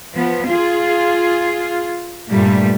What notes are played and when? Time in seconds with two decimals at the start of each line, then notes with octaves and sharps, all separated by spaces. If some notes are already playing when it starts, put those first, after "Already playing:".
0.12 F3 B3
0.47 F4 G#4
2.29 G2 A#2 G3 A3